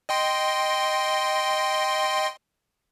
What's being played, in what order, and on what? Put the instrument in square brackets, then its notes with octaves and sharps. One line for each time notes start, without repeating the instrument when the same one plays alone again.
[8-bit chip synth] D#5 G5 C6